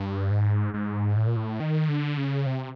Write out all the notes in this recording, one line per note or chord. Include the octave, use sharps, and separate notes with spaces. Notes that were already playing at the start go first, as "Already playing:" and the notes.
Already playing: G2
G#2
G#2
A2
A#2
A2
D#3
D3
C#3
C3